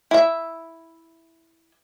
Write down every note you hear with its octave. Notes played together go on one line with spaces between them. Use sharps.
E4 E5